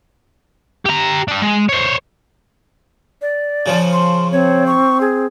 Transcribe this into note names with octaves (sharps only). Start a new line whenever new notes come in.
G4 A#5
D4 G4
G#3
C5 C#5
D5
C#3 F3
C6
C4 C#5
C#6
G#4